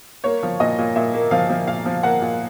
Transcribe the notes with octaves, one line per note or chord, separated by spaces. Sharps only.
A#3 C#5
F3
A#2 D#5
A#2
A#2 E5
A#3
F3 F5
F3
A#2 F5
F3
A#3 F#5
A#2